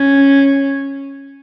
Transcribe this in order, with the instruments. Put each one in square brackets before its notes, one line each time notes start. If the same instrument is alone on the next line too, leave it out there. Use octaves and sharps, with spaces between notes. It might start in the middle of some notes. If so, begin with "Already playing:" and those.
Already playing: [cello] C#4